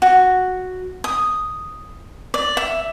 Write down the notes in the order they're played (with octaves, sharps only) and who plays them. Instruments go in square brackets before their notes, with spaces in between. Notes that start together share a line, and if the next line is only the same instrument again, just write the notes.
[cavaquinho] F#4
D#6
D5
E5